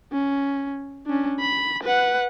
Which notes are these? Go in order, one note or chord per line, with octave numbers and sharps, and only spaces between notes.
C#4
C#4 D4
B5
B4 F#5